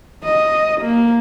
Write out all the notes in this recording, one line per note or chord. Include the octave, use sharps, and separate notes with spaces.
D#5
A#3